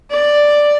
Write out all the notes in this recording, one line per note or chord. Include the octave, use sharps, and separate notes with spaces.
D5